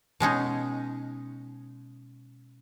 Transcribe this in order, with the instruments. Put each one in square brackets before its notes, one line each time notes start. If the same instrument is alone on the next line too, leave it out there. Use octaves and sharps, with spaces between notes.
[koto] B2 G#3 C#4 D#4